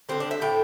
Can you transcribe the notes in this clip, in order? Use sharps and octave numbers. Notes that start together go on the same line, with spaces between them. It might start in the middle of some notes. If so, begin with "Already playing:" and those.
D3 G3 C4
D4
E5
A2 A3 G5